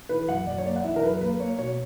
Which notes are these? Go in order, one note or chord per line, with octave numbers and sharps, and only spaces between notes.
E3 B4
F#2 F#5
F#2 D5
C#5
A#3 D5
F#5
E3 E5
A#4
F#2 B4
A#3 B4
A#3 C#5
B2 C#5